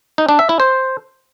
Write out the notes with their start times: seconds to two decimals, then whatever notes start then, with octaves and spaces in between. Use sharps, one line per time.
0.18 D#4
0.29 D4
0.39 E5
0.49 E4
0.60 C5